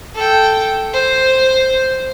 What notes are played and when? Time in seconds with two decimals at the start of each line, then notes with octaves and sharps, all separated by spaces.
0.15 A4 G5
0.93 C5